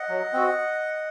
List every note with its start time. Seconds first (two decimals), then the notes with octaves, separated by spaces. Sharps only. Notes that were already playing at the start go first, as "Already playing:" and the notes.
Already playing: D#5 F#5
0.09 F#3
0.33 C4 F#4